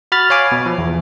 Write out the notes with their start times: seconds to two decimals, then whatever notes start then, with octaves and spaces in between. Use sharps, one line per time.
0.12 F#4 B5 F6 A6
0.30 C#5 F5 G#5 D6
0.52 B2
0.66 F3
0.78 E2